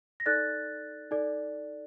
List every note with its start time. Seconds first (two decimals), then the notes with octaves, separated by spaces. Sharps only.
0.20 A#6
0.26 D#4 A4 D5 F#6 A6
1.11 D#4 A4 D5